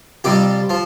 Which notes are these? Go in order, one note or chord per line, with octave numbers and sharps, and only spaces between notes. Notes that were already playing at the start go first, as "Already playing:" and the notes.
F2 C3 G3 G4
F3